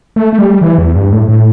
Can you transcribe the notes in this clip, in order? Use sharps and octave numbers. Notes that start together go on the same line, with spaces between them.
A3
A3
G3
E3
E2
G2
A2
A2